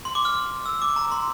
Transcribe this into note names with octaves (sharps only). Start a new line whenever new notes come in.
C6
D6
F6
E6
D6
A#5
C6